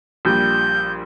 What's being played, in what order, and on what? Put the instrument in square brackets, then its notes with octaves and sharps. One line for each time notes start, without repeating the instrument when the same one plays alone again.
[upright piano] A#1 A#2 G3 [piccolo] G6